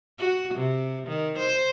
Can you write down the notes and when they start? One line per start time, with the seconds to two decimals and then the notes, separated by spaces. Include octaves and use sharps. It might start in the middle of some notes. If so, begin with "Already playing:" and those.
0.19 F#4
0.55 C3
1.08 D#3
1.39 C5